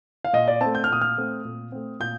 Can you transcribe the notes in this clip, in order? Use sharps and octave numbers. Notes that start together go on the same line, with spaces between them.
F5
A#2 D#5
D5
A3 C4 A5
G6
F6
A#2 D#6
F6
A3 C4
A#2
A3 C4
A#2 G6